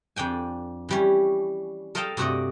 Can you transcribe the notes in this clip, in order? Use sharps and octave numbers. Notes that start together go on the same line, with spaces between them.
F2 D4 G5 G#5
E3 G3 C#4
A4 A#4 D#5 F5 G5 A5
G2 C3 A3 F#4 D5 D#5